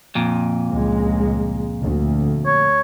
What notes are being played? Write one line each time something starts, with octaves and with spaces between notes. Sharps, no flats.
F2 A#2
C#2 G#3
D2
C#5